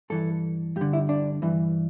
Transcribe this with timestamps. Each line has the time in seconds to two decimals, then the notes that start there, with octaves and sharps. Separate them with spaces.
0.10 G2 E3 A4
0.76 G2 G4
0.81 D3
0.93 E4
1.09 D4
1.42 G2 E3